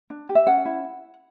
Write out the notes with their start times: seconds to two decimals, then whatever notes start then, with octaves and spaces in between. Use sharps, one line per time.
0.10 D4
0.29 G4
0.35 E5
0.47 C#4 F#5
0.65 E4